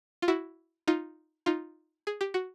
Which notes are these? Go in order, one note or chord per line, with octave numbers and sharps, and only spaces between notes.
F4
E4 F#4
D#4 F4
D#4 F4
G#4
G4
F#4